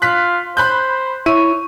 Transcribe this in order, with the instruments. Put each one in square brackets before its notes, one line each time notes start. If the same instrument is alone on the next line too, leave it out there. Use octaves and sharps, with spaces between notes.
[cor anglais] F4 [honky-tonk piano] F#6 B6
[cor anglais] C5 [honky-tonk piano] B5 F#6 G6
[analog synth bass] E4 [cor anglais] C#5 [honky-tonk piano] D#7